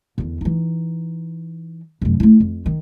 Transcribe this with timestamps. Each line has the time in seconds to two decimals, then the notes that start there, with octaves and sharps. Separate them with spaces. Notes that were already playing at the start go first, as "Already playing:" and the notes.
0.18 E2 D3
0.41 E3 D#4
2.01 F1 F#2
2.20 A3 E4
2.40 F2
2.66 D#3